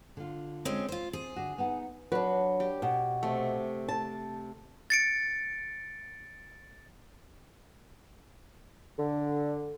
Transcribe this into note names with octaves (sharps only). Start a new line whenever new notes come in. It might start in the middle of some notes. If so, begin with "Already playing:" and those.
D3 F4
G#3 C4 C#4
F4 C5
C4 G#4
D3 D4 F#4
B3 D#4 F#5
F#3 D4 B4
G4
B2
C3 A3
A5
A6 C#7 D7
D3